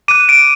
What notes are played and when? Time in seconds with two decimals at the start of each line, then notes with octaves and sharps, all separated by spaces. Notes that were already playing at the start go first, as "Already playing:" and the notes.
0.08 D6 D#7
0.11 F#6
0.29 D7